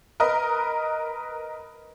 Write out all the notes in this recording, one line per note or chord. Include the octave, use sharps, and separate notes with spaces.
A#4 B4 D#5